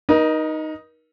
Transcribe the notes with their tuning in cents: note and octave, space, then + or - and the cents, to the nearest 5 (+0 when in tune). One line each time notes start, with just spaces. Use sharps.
D#4 +0 A#4 +40